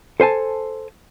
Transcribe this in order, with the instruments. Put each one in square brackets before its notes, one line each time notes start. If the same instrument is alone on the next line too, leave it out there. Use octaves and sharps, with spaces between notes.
[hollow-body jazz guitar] A4 C5 G#5 A5